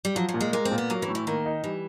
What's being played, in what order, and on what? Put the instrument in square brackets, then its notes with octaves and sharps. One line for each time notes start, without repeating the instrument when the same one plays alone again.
[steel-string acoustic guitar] G3
[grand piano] F3 [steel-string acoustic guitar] F#3
[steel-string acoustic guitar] F#3
[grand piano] A#2
[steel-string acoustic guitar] G#3
[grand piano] G#3 [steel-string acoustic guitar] A#3
[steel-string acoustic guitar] C4
[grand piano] A#2
[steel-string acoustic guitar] B3
[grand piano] F#3 [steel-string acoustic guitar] A#3
[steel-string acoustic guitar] E3
[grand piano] A2
[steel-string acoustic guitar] E3
[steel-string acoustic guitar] D#3 [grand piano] A#3
[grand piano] D#4
[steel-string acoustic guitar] E3 [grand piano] G3